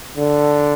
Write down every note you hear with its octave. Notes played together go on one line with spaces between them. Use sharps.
D3